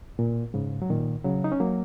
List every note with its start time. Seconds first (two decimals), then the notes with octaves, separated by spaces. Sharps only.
0.19 A#2
0.54 G#2 C#3
0.82 F#3
0.90 A#2 D#3
1.24 C#3 F#3
1.44 D#4
1.52 C#4
1.60 F#3 A#3